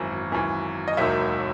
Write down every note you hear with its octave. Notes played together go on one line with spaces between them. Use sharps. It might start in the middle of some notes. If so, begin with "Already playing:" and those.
Already playing: G#1 F#2 E3
G#1 F#2 E3
D#5
E1 D#2 D#3 F#3 E5